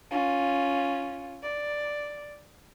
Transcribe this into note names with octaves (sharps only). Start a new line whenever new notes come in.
C#4 F4
D5